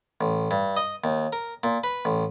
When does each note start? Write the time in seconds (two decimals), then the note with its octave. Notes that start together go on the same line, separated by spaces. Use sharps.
0.21 A1
0.51 G2
0.77 D#5
1.04 D#2
1.33 A#4
1.64 A#2
1.84 B4
2.05 A1